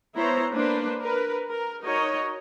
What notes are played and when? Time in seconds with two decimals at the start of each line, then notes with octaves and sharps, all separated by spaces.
0.16 B3 E4 C5 C#5 A#5
0.52 A#3 D4 B4 C5
1.02 A#4 B4
1.50 A#4
1.82 D#4 F#4 A#4 C#5 D#5